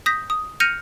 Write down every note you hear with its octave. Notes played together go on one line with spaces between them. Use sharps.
D#6 G6 A#6 B6
D#6
F6 G6 A#6 C#7 D#7 F7